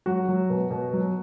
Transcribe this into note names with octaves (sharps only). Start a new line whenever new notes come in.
F#3 F#4
F#3
B2
B2
F#3